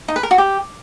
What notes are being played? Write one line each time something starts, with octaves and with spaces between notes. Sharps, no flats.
D#4
B4
A#4
F#4
G4